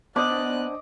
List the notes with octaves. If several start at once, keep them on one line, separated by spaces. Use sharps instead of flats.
B3 D4 C5 D5 D#5 D6 F#6